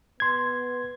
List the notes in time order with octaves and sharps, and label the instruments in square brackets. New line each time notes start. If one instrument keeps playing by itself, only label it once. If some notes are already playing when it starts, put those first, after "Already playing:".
[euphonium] B3 [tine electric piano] C6 G#6